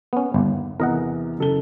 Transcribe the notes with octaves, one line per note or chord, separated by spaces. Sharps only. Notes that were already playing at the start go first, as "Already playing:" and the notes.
B3 C#4
G1 D#2
E2 C3 A#4 D#5 F#5 A#5
F#1 A4 G7